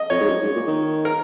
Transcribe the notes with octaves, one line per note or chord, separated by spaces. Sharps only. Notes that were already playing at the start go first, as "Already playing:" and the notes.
Already playing: D#5
F2 C#5
G#2
F#2
G#2
A#2
D#3
A#4